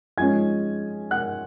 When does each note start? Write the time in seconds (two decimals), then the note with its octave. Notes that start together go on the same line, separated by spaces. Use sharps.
0.18 F3 G#3 C#4 G#5 G#6
1.11 F#5 F#6